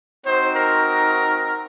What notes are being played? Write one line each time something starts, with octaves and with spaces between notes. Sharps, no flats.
C4 D#4 F#4 C5
A#4